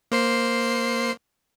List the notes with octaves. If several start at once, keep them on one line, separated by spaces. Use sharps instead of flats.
A#3 C5 C7